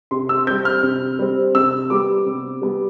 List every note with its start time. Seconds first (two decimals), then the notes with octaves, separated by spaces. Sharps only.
0.11 C3 C6
0.29 E6
0.47 G3 C4 G6
0.65 F6
0.83 C3
1.19 G3 C4
1.55 C3 E6
1.90 G3 B3 D6
2.26 C3
2.62 G3 B3